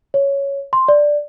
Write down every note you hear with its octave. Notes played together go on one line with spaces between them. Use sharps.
C#5
C6
D5